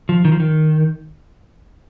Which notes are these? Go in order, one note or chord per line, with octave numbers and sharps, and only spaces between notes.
F3
D#3
F3
D#3